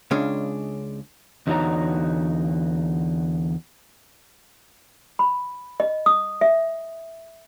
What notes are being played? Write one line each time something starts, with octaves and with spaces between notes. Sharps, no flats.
C#2 C#3 G#3 C#4 D4
E2 D3 D#4 F#4 C#5 A#5
B5
D#5
D#6
E5